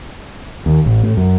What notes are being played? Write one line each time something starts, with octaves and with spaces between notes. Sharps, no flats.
D#2
A1
A2
F#2